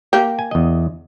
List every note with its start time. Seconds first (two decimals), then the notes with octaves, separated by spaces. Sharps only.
0.13 A#3 G4
0.39 G#5
0.51 E2 D#5